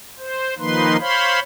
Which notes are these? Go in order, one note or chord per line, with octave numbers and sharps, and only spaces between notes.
C5
D#3 F3 A#3 D#4 B4 C6
C5 C#5 F5 B5 C6